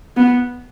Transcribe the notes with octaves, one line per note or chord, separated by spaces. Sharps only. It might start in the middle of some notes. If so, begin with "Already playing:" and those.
B3